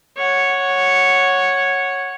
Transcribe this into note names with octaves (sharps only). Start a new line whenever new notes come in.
C#5 F#5